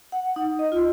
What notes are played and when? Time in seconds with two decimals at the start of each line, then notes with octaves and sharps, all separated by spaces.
0.12 F#5
0.36 D#4
0.59 D#5
0.72 F4